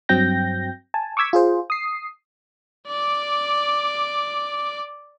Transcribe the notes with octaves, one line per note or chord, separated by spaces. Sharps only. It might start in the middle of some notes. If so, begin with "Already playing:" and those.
G2 F#3 C4 G5 G6 A#6
G#5 A5
C#6 D6 E6 G#6 B6
F4 G#4 C5
D#6 C7
D5 D6